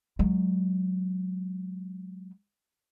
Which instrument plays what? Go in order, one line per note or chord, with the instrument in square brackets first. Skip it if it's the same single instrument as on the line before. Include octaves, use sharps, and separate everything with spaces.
[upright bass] F#3 G#3